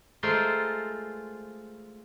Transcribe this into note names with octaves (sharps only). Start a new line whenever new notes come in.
G#3 A3 F4 A4 A#4 C5